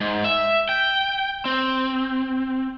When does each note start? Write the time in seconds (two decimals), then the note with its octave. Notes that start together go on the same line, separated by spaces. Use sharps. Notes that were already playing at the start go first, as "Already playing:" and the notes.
0.01 G#2
0.24 E5
0.69 G5
1.45 C4